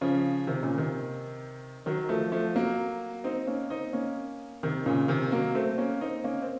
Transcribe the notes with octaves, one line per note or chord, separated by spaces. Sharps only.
C#3 F3
C3 D#3
A#2 C#3
C3 D#3
D#3 F#3
F3 A3
F3 A3
F#3 A#3
C4 D#4
A#3 C#4
C4 D#4
A#3 C#4
C3 D#3
A#2 C#3
C3 D#3
F#3 A#3
A3 C4
A#3 C#4
C4 D#4
A#3 C#4
C4